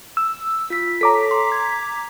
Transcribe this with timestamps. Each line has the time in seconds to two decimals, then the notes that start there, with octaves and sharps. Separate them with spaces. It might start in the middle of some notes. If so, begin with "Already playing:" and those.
0.17 E6
0.70 F4 B6
1.01 A4 C#5 A#5 D6 B6
1.31 C6
1.52 G#6